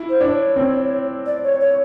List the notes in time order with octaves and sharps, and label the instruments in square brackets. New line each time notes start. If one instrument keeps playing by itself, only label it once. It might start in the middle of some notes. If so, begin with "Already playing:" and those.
Already playing: [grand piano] E4
[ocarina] C5
[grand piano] D4
[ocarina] C#5
[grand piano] C4
[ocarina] D5
C#5
C#5